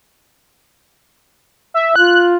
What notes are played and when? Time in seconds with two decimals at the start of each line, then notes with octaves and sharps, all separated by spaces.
1.74 E5
1.96 F4 F#6